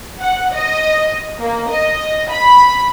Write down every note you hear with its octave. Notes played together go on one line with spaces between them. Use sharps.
F#5
D#5
A#3
D#5
B5